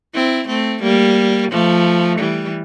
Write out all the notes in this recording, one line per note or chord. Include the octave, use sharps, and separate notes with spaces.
C4 E4
A3 C4
G3 A#3
F3 A3
E3 G3